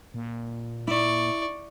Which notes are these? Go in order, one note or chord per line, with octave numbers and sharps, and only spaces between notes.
A#2
E4 D5 C#6